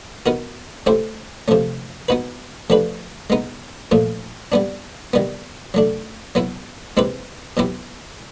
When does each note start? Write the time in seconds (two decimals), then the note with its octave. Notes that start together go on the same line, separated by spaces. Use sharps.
0.26 B3 D#4 F#4 A#4
0.86 A3 C#4 E4 G4 C5
1.48 C3 F3 A3 C#4
2.08 B3 D#4 F#4 B4
2.70 F3 A3 D4 G4 B4
3.30 G#3 B3 D#4
3.91 A#2 F3 A3
4.52 G3 B3 D4
5.13 D#3 G3 B3
5.74 F#3 A3 D4
6.35 F#3 B3 E4
6.97 G#3 C4 E4 G4 B4
7.57 B2 F#3 B3 E4 G4